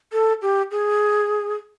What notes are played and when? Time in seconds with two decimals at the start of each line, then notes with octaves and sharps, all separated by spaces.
0.13 A4
0.42 G4
0.71 G#4